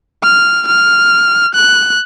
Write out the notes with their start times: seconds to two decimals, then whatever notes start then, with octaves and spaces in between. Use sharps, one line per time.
0.23 F6
0.67 F6
1.54 F#6